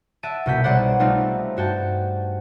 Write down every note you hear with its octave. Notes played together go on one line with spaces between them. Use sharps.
E5 F#5 A5 D7 D#7
C2 B2 F#4 G6 B6
B1 G3 G#4 C5 D5 F#5
G3 A3 C4 D#4 F4
G2 F#4 G5 A5